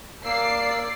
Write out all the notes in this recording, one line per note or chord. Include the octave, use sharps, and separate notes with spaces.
A#3 D5 E6 C7